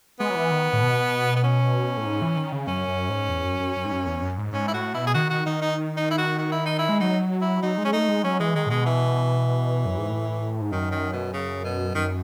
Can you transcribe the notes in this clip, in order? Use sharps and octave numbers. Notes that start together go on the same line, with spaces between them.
G#3 B3
F#3
E3
D#3
A2
B2
B3
C#4
A2
G#2
E3
D#3
C#3
F#2 C#4
F#2
G#2
E2
F#2
F#2
F#2
G#2
F#2
E2
F#2
G#2
G#2 C#4
E4
A2 F#4
B2 E4
G#4
D#3 F#4
F#4
D#3 D#4
D#4
D#4
E4
F#4
F#4
E4
D#4
E4
G#3
F#3 D#4
E4
F#3 D#4
G#3
C#4
A3 D#4
G#3
F#3 C#4
E3 G#3
D#3 G#3
A2
B2 G#3
E3
F#2
G#2
A2
G#2
F#2 D#3
D#3
B2
C#3
B2
F#2 D#3